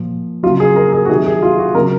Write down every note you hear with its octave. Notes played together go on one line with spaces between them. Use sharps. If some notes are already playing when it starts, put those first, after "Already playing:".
Already playing: A#2 F3
C#3 F#3 F4
G#4
A#4
G#4
F#4
C3 D#3 F#3 G#4
G#4
F4
F#4
C#3 F#3 A#4